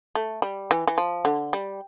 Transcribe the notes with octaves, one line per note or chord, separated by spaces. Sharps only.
A3
G3
E3
E3
F3
D3
G3